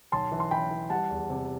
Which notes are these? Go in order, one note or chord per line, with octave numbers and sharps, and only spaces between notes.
B1 A5 C6
E3
C6
E3 G5 B5
E3
G3 F#5 A5
E2
C3